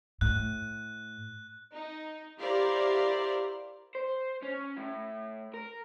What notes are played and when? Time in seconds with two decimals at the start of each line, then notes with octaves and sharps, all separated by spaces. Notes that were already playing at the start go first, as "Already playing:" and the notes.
0.21 A2 F#6
1.74 D#4
2.39 E4 G4 A#4 C5 D5 F5
3.95 C5
4.43 C#4
4.77 A2
5.54 A#4